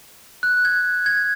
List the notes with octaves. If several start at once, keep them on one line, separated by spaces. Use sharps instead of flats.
F#6
G#6
G#6